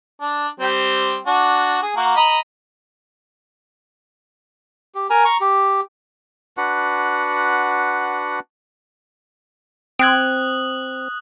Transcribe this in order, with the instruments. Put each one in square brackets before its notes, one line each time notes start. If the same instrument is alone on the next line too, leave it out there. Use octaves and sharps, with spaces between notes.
[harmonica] D4
G3 C4
D4 F#4
G#4
A#3 F#4
D#5 A#5 B5
[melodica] G4
A#4 G#5 A#5
A#5 C#6
G4
D4 F#4 B4 F#5
[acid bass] C4 [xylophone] G5 G#6 [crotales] D#6 F#6 F#7